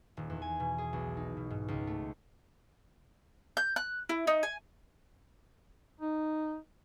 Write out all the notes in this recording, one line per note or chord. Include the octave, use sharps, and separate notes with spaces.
D#1
E2
G#5
B2
G#4
B1
D#4
B2
G#2
C#2
A3
G6
F#6
E4
D#4
G#5
D#4